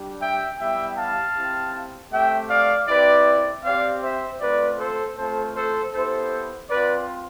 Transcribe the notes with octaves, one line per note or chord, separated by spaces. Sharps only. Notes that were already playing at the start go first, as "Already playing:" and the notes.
Already playing: G3 D4 G4
E5 G5
G3 B3 E4 G4 E5 G5
F5 A5
C4 E4 G4
A3 C4 G4 E5 G5
D5 F5
C4 E4 G4 B4 D5
C4 G4 D5 F5
C5 E5
A3 C4 F4 B4 D5
A4 C5
A3 C4 F4 A4 C5
A4 C5
B3 E4 G4 A4 C5
C4 F4 B4 D5